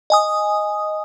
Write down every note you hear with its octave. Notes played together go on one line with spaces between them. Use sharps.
D#5 G#5 D#6